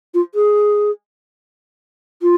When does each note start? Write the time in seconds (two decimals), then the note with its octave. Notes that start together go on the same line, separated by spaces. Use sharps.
0.14 F4
0.34 G#4
2.22 F4